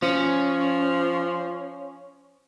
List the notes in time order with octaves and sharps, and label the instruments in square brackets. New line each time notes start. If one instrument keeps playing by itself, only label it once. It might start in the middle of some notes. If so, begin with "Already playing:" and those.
[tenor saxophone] F3 [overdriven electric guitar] C#4